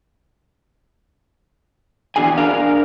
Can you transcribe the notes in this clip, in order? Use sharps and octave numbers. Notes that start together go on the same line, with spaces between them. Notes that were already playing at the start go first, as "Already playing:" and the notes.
E2 D3 D4 F#4 G#4 G#5
D4 A#4 F5